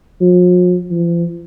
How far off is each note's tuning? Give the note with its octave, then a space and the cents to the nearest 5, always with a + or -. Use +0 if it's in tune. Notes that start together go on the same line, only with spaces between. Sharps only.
F3 +45
F3 -40